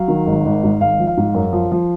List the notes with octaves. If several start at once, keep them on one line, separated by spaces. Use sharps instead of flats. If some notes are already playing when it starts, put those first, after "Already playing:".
Already playing: F#3 F5
D#3
G#1
G#1
G#2
G#1 F5
F3
F5
G#2
F#2
F3
F3